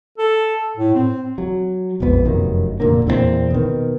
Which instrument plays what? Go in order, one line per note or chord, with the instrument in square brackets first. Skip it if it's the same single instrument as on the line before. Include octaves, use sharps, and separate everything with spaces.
[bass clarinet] A4
A2
C4
[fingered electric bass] F#3
E1 A#1 F2 B3
F1 F#2 D#3
F1 A#2 D3 A#3
E2 A#2 A#3 C4
B2 D#3